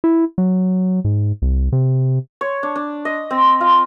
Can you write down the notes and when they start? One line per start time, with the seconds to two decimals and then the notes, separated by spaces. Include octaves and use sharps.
0.04 E4
0.38 F#3
1.05 G#2
1.42 C2
1.72 C3
2.41 C#5
2.63 D4
2.76 D4
3.05 D#5
3.30 C4
3.61 F4